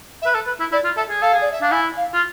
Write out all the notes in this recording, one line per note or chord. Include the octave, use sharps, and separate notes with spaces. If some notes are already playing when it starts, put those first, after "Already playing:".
E5
B4
A4
B4
E4
E4 D5
F4
A4 E5
G#4
A4 F5
G#4
D5
E5
D4 F5
E4 G#5
F5
F4